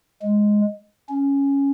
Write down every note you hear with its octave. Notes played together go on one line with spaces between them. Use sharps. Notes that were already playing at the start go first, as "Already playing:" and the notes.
G#3
C#4